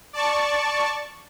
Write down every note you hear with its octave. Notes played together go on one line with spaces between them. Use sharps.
D5 A5 C#6